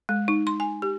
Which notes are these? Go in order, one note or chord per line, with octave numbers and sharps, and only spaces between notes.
G#3
D#4
C6
G#5
G4